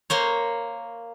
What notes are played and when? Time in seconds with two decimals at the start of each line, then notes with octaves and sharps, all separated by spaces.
0.10 A#3 C5 C#5